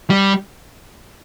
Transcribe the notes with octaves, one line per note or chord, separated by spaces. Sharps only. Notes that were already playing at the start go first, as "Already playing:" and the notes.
G3